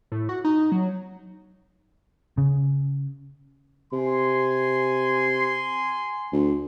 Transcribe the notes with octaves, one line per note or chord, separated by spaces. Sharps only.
A2
F#4
D#4
F#3
C#3
C3 G#5 C6
D2